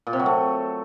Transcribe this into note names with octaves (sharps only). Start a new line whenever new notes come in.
A#2
C3
F#3
A3